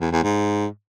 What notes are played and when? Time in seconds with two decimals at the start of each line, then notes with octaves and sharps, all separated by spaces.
0.01 E2
0.12 E2
0.23 G#2